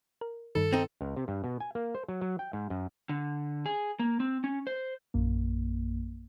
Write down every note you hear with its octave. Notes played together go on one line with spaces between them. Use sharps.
A#4
G2 D#3 A4
C4 D#4
C#2
C3
G2
B2
G#5
A#3
C5
F#3
F#3
G5
G#2
F#2
D3
G#4
A#3
C4
C#4
C5
A#1 F#2 A#3